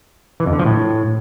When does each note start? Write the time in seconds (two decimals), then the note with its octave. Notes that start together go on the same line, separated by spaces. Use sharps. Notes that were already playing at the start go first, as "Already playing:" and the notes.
0.40 E3
0.46 F2
0.53 D3
0.59 F3
0.66 A2